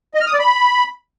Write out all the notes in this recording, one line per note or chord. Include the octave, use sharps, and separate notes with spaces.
D#5
F6
D#6
D5
B5